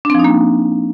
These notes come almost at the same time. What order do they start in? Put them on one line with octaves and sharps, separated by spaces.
D4 C4 F3 D#4 A#3